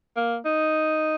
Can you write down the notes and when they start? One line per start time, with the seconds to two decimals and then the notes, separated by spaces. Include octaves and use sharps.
0.16 A#3
0.45 D#4